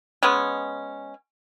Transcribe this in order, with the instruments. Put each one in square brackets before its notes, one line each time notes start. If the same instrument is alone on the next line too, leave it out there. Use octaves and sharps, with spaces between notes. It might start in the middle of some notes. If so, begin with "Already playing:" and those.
[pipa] G#3 B3 C#4